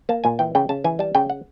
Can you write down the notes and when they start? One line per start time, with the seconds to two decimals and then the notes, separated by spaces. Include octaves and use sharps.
0.09 A#3 A5
0.24 A#2 G#5
0.39 E3 G5
0.55 C#3 G5
0.69 C#3 A5
0.84 E3 G#5
0.99 G3 A5
1.15 C#3 G5
1.30 F#5